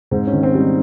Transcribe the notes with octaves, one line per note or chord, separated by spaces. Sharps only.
G#2 C4
C#4
D#3
C4
G3 D#4